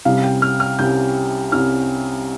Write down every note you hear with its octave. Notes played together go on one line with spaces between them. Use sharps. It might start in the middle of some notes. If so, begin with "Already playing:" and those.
C2 C3 G3 C#4 F5
G5
F6
F6
C2 C3 G3 C#4 G6
C2 C3 G3 C#4 F6